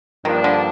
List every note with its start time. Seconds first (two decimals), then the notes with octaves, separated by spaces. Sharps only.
0.25 G2 D#3 F3 A#3 D4
0.44 D3